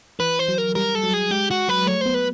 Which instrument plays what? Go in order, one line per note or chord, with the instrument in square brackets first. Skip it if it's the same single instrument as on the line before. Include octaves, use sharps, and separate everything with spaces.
[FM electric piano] E3 [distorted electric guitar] B4
[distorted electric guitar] C5
[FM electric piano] F#3
[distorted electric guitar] A#4
[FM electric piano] G3 [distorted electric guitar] A#4
[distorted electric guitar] A4
[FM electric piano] F#3
[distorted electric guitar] G#4
[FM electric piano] G#3 [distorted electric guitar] G4
[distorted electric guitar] F#4
[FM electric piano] F#3 [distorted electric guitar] B4
[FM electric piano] A3 [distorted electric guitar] C#5
[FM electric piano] B3 [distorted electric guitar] C5
[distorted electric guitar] B4